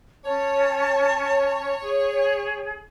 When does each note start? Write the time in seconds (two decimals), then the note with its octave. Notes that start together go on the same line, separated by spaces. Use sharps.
0.25 C#4 C#5 A5
1.82 G#4